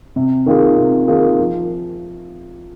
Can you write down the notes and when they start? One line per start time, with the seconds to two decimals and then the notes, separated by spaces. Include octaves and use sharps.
0.16 C3
0.46 D#3 A#3 F4 G#4
0.77 C3
1.08 D#3 A#3 F4 G#4
1.39 F3